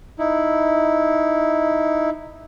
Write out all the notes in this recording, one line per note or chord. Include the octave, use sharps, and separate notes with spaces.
D#4 E4